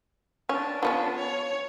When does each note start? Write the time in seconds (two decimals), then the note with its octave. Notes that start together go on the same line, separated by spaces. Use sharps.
0.49 C#4 D4
0.83 F3 B3 C#4
1.18 C#5